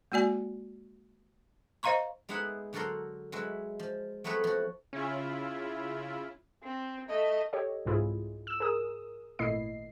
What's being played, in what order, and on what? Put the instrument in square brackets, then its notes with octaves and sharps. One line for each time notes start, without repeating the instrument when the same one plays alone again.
[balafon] G#3 A#3 F#4 D5 G#5
C5 D#5 F5 A#5 C6 C#6
[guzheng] G#3 B3 D#4 G#4 E5 F#5
D3 F#3 F#4 A4 A#4 C6
F#3 G#3 B4 E5
F3
F#3 A3 B3 C4 B4 C#5
F3 F#4
[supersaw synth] C#3 E4 F4 [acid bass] C#4
[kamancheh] C4
A3 D#5
[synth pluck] G4 A4 C#5 D#5
C2 G#2 E4 F4 G#4
E6 E7
G#4 A#4 D#6
G#1 A#2 A3 E4 D#5 C7